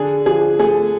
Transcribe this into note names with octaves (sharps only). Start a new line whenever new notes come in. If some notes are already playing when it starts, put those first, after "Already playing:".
Already playing: D3 D4 G#4
F3 G#4
A3 G#4